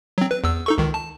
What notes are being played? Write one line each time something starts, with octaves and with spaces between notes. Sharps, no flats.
F#3 C4
B4
E2 E6
D#4 A4 C#6
C#2 D#3
A5